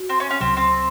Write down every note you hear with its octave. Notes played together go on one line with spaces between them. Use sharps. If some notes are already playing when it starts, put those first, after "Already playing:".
Already playing: F#4
C4
C#4
C#4
C#2 C3 F#3 C4
C4